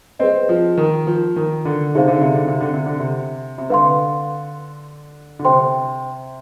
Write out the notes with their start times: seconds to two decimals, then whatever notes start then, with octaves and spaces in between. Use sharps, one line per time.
0.19 C4 G#4 B4 D#5
0.49 F3
0.78 D#3
1.07 F3
1.36 D#3
1.65 D3
1.95 C3 D#4 G#4 C5 F5
2.08 D3
2.21 C3
2.34 D3
2.48 C3
2.60 D3
2.74 C3
2.86 D3
3.00 C3
3.58 C3
3.70 D3 B4 F5 C6
5.39 D3
5.45 C3 C5 G5 C6